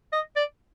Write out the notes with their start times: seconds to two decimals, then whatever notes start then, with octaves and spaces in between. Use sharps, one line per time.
0.12 D#5
0.36 D5